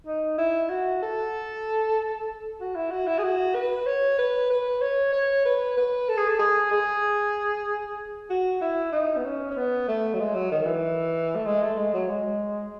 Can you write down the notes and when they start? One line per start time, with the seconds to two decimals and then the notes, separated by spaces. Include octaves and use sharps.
0.07 D#4
0.38 E4
0.70 F#4
1.02 A4
2.60 F#4
2.76 E4
2.91 F#4
3.07 E4
3.19 G#4
3.23 F#4
3.55 B4
3.86 C#5
4.18 B4
4.50 B4
4.81 C#5
5.13 C#5
5.45 B4
5.77 B4
6.09 A4
6.17 G#4
6.28 A4
6.39 G#4
6.71 G#4
8.30 F#4
8.61 E4
8.92 D#4
9.17 B3
9.25 C#4
9.50 C#4
9.57 B3
9.88 A3
10.14 F#3
10.19 G#3
10.35 F#3
10.52 D#3
10.62 D#3
10.66 E3
11.36 A3
11.45 G#3
11.62 A3
11.77 G#3
11.93 F#3
12.09 G#3